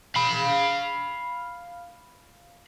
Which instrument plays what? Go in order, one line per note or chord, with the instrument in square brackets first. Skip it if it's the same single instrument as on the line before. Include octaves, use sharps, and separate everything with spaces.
[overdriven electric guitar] F5 B5